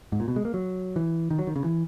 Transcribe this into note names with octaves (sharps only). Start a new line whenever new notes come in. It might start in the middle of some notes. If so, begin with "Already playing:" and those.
G#2
A#2
B2
G#3
A#3
F#3
E3
D#3
F#3
D#3
C#3
E3